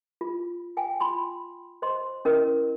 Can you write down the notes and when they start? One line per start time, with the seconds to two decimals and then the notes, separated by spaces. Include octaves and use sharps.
0.21 F4
0.77 F5 G5 G#5
1.00 F4 B5 C6
1.82 C5 D#5 C6
2.25 C#4 E4 A#4 D#5